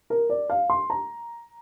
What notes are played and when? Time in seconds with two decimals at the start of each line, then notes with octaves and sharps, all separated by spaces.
0.10 A#4
0.30 D5
0.50 F5
0.70 C6
0.90 A#5